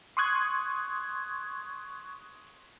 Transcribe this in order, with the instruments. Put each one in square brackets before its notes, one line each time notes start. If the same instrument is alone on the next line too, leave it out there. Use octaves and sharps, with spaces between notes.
[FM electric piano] C6 C#6 D#6 F#6 G#6